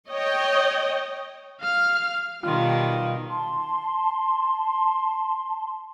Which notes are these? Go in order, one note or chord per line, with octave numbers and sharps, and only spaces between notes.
C#5 D#5 G5
F5 F6
B2 D#3 G3 F4
A5 C6